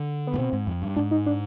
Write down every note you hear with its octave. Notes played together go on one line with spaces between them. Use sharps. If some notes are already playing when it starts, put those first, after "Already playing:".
Already playing: D3
B3
G#2
B2 C4
G#2
F2
G2
G#2 D4
D#4
D4